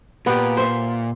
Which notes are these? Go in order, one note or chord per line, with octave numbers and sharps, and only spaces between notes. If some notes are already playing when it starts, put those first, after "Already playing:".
A#2 B3 G4
C5 E5